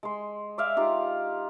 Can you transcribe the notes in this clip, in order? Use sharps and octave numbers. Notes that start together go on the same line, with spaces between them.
G#3 C6
D5 E5 F5
D#4 F4 G4